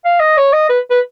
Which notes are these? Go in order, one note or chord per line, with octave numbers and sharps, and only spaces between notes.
F5
D#5
C#5
D#5
B4
B4